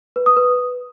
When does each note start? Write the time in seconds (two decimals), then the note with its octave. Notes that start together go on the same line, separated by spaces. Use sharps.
0.16 B4
0.26 D#6
0.37 B4